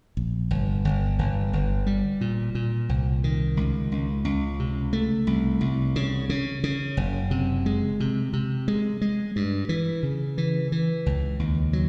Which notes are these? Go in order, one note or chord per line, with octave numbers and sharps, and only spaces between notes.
A#1
G1
G1
G1
G1
G3
A#2
A#2
C2
D#3
C#2
C#2
C#2
C3
A3
C2
C2
C#3
C#3
C#3
F#1
C3
G#3
C3
C3
G#3
G#3
G2
E3
C#3
E3
E3
C#2
D#2
F#3